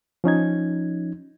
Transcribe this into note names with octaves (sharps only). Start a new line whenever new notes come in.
F3 C#4 D#4 G#6